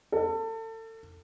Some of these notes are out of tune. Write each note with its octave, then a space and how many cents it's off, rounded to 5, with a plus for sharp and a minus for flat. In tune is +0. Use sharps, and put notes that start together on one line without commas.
A4 +30